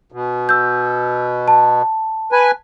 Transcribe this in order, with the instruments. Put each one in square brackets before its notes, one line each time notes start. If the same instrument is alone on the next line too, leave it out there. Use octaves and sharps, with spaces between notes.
[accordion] B2
[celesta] E6 G6
A5
[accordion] B4 G#5